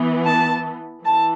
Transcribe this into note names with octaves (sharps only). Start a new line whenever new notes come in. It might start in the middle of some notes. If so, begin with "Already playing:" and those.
Already playing: E3 B3
A5
E3 A5